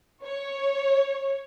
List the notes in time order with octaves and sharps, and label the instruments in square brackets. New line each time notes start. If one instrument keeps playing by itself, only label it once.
[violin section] C#5